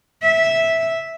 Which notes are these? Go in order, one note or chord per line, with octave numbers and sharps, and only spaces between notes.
E5